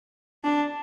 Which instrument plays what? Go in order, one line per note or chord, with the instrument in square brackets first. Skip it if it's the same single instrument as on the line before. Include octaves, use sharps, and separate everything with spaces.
[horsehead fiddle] D4